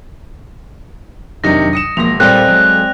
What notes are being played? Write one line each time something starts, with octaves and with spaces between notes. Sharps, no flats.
F2 C3 D#3 F#3 D4 D#4 A#6
D#6 C#7 E7
E1 F3 A#3 C6 A#6 F7
A#2 G3 C4 A4 C5 D5 F5 F#6
F#3 G#3